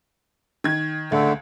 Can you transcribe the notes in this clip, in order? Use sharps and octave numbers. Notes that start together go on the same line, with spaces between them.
D#3 G#6
C#2 D3 A3